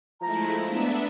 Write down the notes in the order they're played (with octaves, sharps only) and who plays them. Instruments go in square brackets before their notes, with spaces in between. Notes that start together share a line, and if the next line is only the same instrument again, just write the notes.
[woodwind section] F3 A#5 [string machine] G#3 A3 E4
[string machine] B3 D4 E5